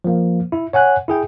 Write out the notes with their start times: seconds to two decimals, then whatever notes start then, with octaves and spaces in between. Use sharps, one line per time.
0.04 F3 A#3
0.52 E4
0.73 C#5 F#5 G#5 F#6
1.08 E4 G#4 G5